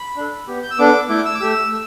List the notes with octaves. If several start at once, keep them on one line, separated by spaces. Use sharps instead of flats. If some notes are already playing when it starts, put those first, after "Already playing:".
Already playing: B5
D4 A4
B3 G4
G6
E6
B3 D4 A4 D6
A3 E4 A4 D6
E6
D6
A3 G4 E6
A3